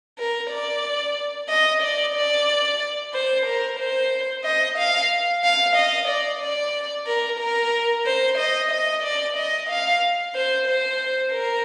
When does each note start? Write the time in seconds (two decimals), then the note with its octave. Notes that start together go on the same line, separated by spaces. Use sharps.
0.18 A#4
0.51 D5
1.49 D#5
1.83 D5
2.15 D5
3.14 C5
3.46 A#4
3.79 C5
4.44 D#5
4.78 F5
5.43 F5
5.76 D#5
6.08 D5
6.41 D5
7.07 A#4
7.39 A#4
8.06 C5
8.38 D#5
8.71 D#5
9.03 D5
9.37 D#5
9.69 F5
10.35 C5
10.67 C5
11.33 A#4